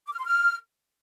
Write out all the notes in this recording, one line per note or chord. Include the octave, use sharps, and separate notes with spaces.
D6
F6
C6
F6